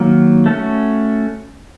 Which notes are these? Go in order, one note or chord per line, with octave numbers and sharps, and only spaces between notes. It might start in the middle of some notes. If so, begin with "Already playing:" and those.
Already playing: D#3 F#3 A#3
A3 C#4 F#4